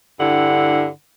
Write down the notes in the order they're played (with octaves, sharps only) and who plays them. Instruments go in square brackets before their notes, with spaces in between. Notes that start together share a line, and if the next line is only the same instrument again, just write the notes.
[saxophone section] G2 D3 E4 F#5